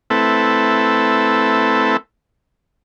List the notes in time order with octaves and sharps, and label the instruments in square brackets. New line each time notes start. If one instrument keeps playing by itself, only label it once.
[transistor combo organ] A3 C4 E4 A4 B4